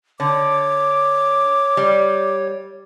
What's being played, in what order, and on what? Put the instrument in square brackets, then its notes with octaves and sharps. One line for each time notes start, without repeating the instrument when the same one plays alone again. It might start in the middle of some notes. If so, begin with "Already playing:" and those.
[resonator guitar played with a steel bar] D3 [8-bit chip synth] C#5 [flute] D6
[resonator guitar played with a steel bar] G3